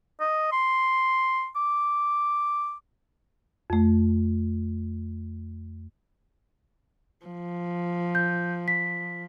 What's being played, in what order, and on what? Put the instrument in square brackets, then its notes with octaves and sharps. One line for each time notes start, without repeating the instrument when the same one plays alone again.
[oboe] D#5
C6
D6
[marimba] F2 A3
[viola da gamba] F3
[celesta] G6
B6